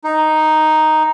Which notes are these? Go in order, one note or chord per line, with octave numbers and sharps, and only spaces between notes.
D#4